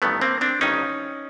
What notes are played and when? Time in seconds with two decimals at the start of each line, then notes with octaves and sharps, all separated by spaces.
0.02 A1 G2 D#3 A3 B3
0.21 A#3 C4
0.41 C4 D4
0.61 A1 G2 D#3 C#4 D#4